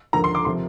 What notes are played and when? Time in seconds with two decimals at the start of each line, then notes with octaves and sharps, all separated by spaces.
0.13 D#2 D3 F3 A#5
0.24 C6
0.35 D6
0.45 C3 F3 C6